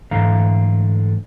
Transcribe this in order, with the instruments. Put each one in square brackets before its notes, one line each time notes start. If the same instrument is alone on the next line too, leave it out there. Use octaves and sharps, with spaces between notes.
[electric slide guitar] G#2 D3 E3 A3 F5 A#5